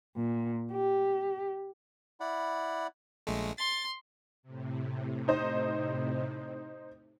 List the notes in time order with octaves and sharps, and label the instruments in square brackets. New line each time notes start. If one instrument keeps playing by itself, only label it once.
[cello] A#2
G4
[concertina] E4 D5 F#5 B5
[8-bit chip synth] A#1 G#3 A3
[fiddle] C6 [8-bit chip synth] A6
[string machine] A2 C3
[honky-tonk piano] D#4 C5 D#5